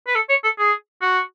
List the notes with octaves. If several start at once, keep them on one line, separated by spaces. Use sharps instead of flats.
B4
A4
C#5
A4
G#4
F#4